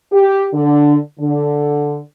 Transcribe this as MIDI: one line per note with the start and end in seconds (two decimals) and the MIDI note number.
0.13 0.46 67
0.54 0.96 50
1.19 1.98 50